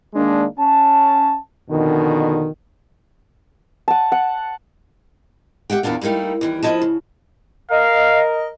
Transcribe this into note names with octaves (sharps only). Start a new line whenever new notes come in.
D#3 G#3 A#3 D4
C#4 A5
F2 B2 D3 D#3
F#5 A5
F#5
G4 E5 F#5 G5
E2 A#2 B3 D4 F5
G3 A3 A#3 D#4 E4
D#2 E3 G3
D#2 F3 D4 E4 D#5 A5
C#3
A#4 D#5 F5